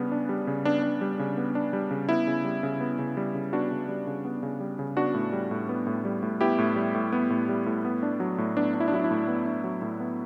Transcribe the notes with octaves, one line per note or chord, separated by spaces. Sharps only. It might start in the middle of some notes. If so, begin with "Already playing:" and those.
Already playing: C#3 G3 B3 D4
D4
G3
C#3
B3 D4
D4
G3
C#3
B3
D4
G3
C#3
B3 E4
C#3
G3
C#3
B3
C#3
G3
C#3
B3 D4 F#4
C#3
G3
C#3
B3
C#3
G3
C#3
B3 D4 F#4
A2
G3
A2
B3
A2
G3
A2
B3 E4 G4
A2
G3
A2
B3
A2
G3
A2
B3
D4
F#3
A2
B3 D4
D4
E4
D4
F#3 E4
E4
A2
B3
D4
F#3
A2
B3